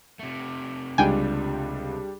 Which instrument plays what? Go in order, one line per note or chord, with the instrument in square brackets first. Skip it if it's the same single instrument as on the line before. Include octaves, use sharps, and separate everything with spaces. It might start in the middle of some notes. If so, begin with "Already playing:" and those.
[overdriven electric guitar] C3 A3
[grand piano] C#2 [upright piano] G3 D4 [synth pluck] G5 G#5